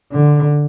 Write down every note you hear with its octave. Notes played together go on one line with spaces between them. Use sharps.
D3